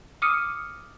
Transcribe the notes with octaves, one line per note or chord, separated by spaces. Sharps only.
D6 D#6 F6 C#7 D#7